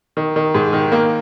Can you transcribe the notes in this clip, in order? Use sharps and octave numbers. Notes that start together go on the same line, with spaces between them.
D#3
D#3
G#2
D#3
A#3